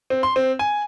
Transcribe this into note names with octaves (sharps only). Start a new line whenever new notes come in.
C4
C6
C4
G#5